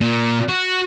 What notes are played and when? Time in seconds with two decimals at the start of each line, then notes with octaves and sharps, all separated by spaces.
0.01 A#2
0.49 F#4